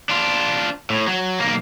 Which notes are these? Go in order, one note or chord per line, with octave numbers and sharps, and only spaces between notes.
D4 F4
A2
F#3
B1 A#3